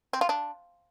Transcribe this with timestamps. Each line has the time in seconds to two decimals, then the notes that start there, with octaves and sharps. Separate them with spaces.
0.13 C4
0.21 F4
0.29 D4